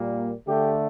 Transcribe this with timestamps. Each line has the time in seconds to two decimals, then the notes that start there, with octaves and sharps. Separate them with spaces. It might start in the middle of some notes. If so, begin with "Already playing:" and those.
Already playing: A#2 G3 A#3
0.47 D3 A3 G4